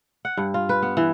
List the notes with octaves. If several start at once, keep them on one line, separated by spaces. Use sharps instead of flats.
F#5
G2
F4
B4
B3
E3